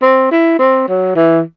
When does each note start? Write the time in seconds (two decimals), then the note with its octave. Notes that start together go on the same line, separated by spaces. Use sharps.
0.02 C4
0.31 E4
0.59 C4
0.88 F#3
1.16 E3